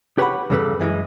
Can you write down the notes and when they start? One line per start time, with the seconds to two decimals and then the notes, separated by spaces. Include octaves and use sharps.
0.18 G4 B4 C#5 F#5 G5 B5
0.50 E2 G2 C#3 G3 A4 B4
0.80 F#2 E3 G3 G#3